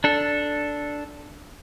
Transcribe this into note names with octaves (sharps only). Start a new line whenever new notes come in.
D4 A4